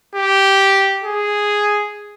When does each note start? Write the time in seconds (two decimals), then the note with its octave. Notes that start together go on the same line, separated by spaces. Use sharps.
0.16 G4
1.04 G#4